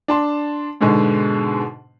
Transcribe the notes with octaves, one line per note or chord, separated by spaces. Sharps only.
D4 A5 C6
G#2 B2 D3 G#3 B3